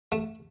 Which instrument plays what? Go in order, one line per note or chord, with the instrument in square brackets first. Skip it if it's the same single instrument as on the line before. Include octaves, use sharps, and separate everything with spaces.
[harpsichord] A3